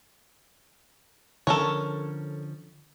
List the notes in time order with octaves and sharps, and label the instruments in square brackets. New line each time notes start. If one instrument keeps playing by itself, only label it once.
[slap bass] D3 F3 C#4 [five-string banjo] A4 A#4 C#5